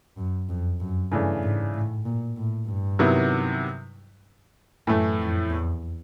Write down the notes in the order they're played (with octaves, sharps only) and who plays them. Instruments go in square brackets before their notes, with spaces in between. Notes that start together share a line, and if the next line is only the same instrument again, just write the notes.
[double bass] F#2
F2
F#2
[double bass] G2 [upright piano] C#3 E3 A3 D4
[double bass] G#2
A2
A#2
A2
G2
[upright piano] C3 D#3 F#3 B3 E4
[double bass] F#2 [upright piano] A2 E3 A3
[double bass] F2
E2